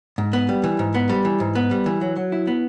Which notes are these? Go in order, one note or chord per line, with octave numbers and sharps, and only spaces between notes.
G#2
B3
G3
E3
G#2
B3
G3
E3
G#2
B3
G3
E3
F#3
F#3
E4
B3